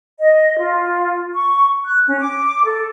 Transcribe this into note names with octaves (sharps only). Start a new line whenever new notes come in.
D#5
F4
C#6
F#6
C#4
D6
A4